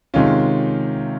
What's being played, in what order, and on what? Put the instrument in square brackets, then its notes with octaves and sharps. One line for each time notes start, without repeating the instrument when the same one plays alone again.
[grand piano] C3 D#3 G#3 C#4 F4